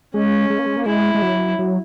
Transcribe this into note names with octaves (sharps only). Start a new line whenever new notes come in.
G#3 C#4
G#3
A#3
G#3
A#3
G#3 E4
G#3
F#3
F#3